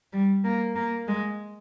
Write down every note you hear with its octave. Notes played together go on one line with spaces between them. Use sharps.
G3
A#3
A#3
G#3